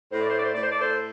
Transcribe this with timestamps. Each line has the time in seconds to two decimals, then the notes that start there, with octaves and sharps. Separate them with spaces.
0.11 A2 C5
0.20 D5
0.29 C5
0.37 D5
0.45 C5
0.54 A2 D5
0.62 C5
0.70 D5
0.78 A4 C5